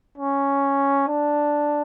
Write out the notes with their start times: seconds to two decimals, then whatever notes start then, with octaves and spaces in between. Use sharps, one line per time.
0.18 C#4
1.08 D4